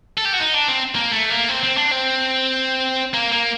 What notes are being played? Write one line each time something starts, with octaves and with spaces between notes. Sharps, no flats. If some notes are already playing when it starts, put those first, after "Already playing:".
A4
G4
F#4
D#4
D4
C4
A#3
A3
A#3
C4
C4
D4
C4
A#3
A#3